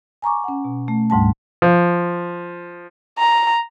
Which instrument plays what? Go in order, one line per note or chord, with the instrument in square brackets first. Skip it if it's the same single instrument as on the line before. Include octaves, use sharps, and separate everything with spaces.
[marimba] G#5 A#5 C#6 D6
C#4 F#5
B2
A3
D2 G#2 G3 A5
[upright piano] F3
[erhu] A#5